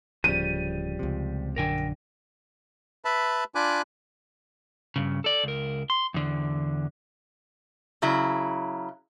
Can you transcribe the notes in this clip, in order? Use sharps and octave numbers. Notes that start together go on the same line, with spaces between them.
D1 C#3 F3 G3 D#7
C#2 C3
A#1 F#2 D3 A#4 G5 G#5
B4 E5 A5 B5
D4 F4 G#5 B5 D6 F#6
G2 C#3
A4 D5
C#2 A#4
C6
E2 D3
C#3 F#3 E4